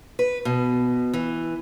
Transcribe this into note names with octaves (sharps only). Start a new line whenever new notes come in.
B4
B2
E3